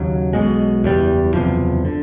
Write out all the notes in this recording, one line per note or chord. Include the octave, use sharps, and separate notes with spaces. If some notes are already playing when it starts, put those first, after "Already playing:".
Already playing: D#2 C#3 F#3
B1 B2 G#3
F#1 E2 B2 G3
F#1 E2 C3 F3
D3